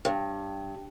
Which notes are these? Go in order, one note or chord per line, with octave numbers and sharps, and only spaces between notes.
G2